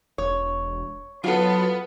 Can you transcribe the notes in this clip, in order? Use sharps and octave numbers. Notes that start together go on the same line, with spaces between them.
E1 C#5
F#3 B3 F4 A4